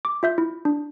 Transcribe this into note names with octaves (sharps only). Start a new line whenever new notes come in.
D6
F4 E5 G6
E4
D4